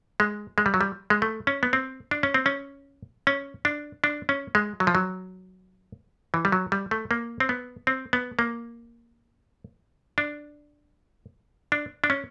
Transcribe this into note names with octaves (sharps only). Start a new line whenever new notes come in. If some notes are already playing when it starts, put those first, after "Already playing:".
G#3
G#3
G3
F#3
G3
G#3
A3
C#4
B3
C4
D4
C#4
C4
C#4
C#4
D4
D4
C#4
G#3
F#3
F3
F#3
E3
G3
F#3
G3
A3
A#3
C4
B3
C4
B3
A#3
D4
D4
D4
C#4